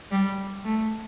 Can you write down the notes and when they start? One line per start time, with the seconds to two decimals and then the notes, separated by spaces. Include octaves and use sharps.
0.11 G3
0.65 A3